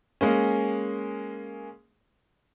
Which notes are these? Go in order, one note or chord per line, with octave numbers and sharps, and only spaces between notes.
G#3 A#3 C#4